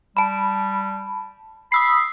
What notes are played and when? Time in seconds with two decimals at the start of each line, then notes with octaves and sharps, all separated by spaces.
0.17 G3 A5 B5
1.72 B5 D#6 E6 C7